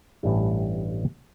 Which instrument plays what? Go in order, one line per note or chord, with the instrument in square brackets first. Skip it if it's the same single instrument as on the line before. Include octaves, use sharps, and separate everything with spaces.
[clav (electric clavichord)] A1 G2 G3 E4